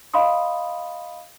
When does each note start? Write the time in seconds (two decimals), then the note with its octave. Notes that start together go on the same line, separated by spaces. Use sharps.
0.14 D#5 F5 B5 C6 D#6